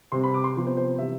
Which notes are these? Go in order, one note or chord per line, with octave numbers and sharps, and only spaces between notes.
C3 G3 C4 C6
B5
D6
C6
C3 F3 B3
C5
C5
C3 E3 G3 E5